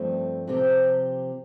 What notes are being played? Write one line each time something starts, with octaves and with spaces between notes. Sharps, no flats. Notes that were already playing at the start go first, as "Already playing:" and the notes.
Already playing: G2 F3 A3 C4
C3 F3 C4 G4